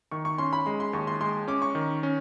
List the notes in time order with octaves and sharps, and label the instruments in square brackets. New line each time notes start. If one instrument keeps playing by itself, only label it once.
[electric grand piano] D#3 [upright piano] C#6
[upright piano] C#6
[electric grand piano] C#4 [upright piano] C6
[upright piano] B5
[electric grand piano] G#3 [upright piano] C6
[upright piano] C6
[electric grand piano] D#2 [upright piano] C#6
[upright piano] C6
[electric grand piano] G#3 [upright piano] C6
[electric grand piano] C#4 [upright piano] D6
[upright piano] C#6
[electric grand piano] D#3
C#4